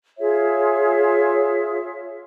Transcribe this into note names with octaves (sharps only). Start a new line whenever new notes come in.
F4 G#4 C#5 E5